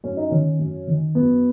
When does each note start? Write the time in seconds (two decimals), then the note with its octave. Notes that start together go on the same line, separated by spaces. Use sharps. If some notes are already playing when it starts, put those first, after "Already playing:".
0.04 F#2 C#4
0.17 D#4
0.30 D#3 C#4
0.59 F#2
0.87 D#3
1.15 F#2 B3